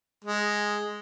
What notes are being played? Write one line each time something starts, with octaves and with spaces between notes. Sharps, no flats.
G#3